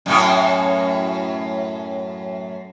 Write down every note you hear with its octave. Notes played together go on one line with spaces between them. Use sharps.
F#2 A2 C#4